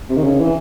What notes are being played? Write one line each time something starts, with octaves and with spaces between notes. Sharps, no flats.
C3
D#3
C#3
E3